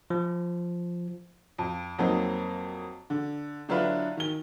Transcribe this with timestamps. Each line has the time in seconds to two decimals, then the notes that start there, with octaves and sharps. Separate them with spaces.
0.10 F3
1.58 F2
1.98 F2 F#3 A#3 C4 D#4
3.10 D3
3.69 D3 F#3 D4 E4 F4 B4
4.17 D#3 G7